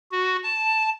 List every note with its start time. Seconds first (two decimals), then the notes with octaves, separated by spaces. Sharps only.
0.11 F#4
0.43 A5